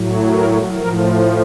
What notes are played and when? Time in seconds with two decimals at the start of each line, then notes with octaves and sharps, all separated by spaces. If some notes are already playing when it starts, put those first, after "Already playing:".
Already playing: A2 F#3
0.32 A#4
0.75 A2 F3 A#4